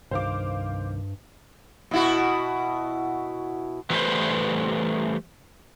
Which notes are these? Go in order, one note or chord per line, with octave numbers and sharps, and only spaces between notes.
C2 G2 D#3 C5 F5 D6
B2 E4 F#4
E3 F#3 G3 A3 B4 C5